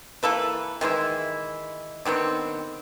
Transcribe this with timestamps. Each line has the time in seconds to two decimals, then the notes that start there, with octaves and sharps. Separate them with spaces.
0.23 E3 A#3 A4 B4
0.81 D#3 E3 G#3 E4
2.05 D3 D#3 B3 C4